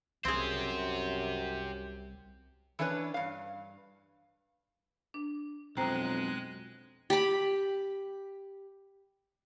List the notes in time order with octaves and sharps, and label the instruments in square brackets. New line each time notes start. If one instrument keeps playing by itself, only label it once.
[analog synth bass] C2 [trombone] F#2 [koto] C4 G#4 [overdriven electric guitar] G4 C5
[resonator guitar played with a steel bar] E3 A3 C#4 D4 B4 C#5
G2 F5
[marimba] D4
[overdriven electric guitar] B1 [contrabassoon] F2 [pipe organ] G#3 F#6 [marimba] C5 G5 A#5
[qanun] G4 B5